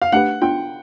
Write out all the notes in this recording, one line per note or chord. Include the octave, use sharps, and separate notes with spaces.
F5
A3 D4 G4 B4 F#5
B3 D4 F4 G5